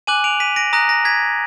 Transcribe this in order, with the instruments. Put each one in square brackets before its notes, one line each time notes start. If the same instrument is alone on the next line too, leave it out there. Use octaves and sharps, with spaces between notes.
[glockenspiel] G#5 D6 F#6 D#7 F#7
D7 F7
B6 D#7
A#6 D7
A#5 D#6 F#6 A#6
A#6
G#6 B6